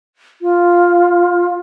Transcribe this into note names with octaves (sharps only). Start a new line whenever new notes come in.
F4